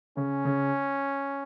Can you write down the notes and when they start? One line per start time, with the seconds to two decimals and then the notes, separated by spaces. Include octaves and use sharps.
0.17 C#3 C#4
0.45 C#3